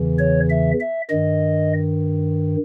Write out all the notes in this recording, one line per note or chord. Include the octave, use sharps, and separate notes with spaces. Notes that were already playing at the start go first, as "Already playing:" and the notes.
Already playing: E2 C#3 E3
C#5
E5
E5
G2 D#3 D#5